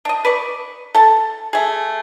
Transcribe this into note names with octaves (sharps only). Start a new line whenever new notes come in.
D4 D#5
B4 D5 C#6
A4 A5
A3 G#4